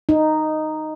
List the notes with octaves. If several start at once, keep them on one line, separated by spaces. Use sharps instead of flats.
D#4